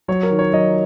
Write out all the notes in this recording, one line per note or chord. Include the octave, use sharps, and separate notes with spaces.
F#3 C#5
A#4
D#3
C#5
F#3 D#5